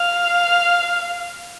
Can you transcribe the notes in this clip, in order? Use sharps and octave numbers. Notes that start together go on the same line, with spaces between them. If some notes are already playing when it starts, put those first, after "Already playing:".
Already playing: F5